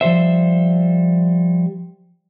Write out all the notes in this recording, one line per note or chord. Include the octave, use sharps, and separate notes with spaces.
F3 G3 C5 E5